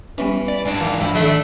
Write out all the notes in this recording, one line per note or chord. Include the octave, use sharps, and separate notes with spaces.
E3 G3 B3 C#4
D5
G#2 D4 D5 G5 A5
E3 A#3 E5 F#5
F3 F#3 E4 G5
D#3 E3 A3 D4